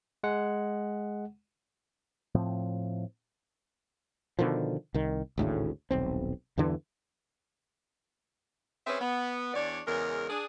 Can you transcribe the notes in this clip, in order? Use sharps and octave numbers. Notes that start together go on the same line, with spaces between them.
G#3 F#5
A2 F3 C4
B2 D3 D#3 F3
C2 D#3
G#1 D2 A2 C#3
D#1 B1 C4
E2 G2 D3 E3
C4 C#4 G#4 B4 E5
B3
E2 D4 C#5 D5
E2 C#3 G#3 A#4
D4 G#4